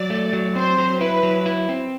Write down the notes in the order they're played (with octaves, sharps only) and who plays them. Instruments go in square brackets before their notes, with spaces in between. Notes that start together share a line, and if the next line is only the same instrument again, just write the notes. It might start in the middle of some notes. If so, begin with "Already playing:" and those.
Already playing: [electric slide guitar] F#3 [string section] D5
[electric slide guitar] A3
F#3
[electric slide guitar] C4 [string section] C5
[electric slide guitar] F#3
[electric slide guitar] E4 [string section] B4
[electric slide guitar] F#3
E4
C4